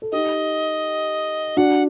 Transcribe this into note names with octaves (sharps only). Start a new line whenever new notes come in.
A4
D#4 G4 D#5
D4 F#4 F#5